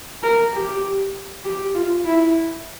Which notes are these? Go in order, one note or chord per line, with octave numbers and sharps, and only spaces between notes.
A#4
G4
G4
F4
E4